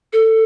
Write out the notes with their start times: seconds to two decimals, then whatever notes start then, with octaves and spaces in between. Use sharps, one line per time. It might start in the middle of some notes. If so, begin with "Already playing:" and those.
0.13 A4